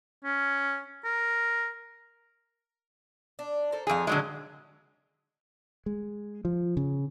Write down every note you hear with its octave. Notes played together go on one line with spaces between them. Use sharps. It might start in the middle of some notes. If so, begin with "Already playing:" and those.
C#4
A#4
D4
A4 A#4 C5
F2 G#4 A4 F5
A#2 D3 F#3 G#3 D4
G#3
F3
C#3